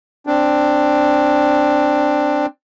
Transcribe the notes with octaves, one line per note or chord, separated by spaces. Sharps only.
C4 D4